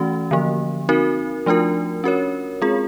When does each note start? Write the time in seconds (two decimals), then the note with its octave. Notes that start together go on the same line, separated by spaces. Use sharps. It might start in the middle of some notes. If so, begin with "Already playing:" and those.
Already playing: E3 A3 C#4 F#4
0.31 D3 F3 A#3
0.89 C4 D#4 F#4 A#4
1.46 F3 A3 D4 F4 A#4
2.04 C#4 F#4 A#4 C#5
2.62 G#3 C4 F4 G#4